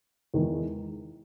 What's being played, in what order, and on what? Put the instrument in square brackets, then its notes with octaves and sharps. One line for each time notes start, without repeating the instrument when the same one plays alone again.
[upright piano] E2 D#3 G#3